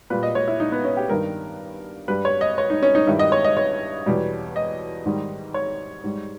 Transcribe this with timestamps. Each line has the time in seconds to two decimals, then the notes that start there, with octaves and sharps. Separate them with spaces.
0.10 A#2 G3 B4
0.23 D#5
0.35 C#5
0.48 E4
0.60 D#4
0.72 B3
0.85 C#4
0.97 G4
1.09 G2 D#3 G3 A#4
2.08 G2 G3 B4
2.25 C#5
2.41 D#5
2.58 C#5
2.70 D#4
2.83 C#4
2.95 D#4
3.07 G2 D#3 G3 E4
3.19 D#5
3.32 C#5
3.44 D#5
3.57 C#5
4.06 E2 B2 G3
4.56 D#5
5.06 G#2 D#3 G3
5.54 C#5
6.04 G#2 G3